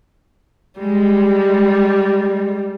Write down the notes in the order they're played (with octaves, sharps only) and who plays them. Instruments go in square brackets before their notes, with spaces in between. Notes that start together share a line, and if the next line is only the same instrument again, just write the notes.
[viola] G3 [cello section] G#3